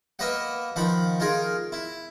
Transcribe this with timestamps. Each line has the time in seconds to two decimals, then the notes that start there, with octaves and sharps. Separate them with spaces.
0.19 A#3 B4 D#5 E5 F#5
0.76 D#3 F3 F#5 B5
1.20 D#4 F4 G#4 A#4
1.72 E4